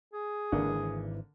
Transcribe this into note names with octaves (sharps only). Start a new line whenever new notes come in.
G#4
G#1 D3 E3 A#3